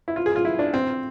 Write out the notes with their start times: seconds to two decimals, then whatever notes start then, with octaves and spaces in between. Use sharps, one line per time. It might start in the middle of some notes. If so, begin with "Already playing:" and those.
0.08 E4
0.16 F4
0.26 G#4
0.36 F4
0.45 E4
0.59 D4
0.74 C4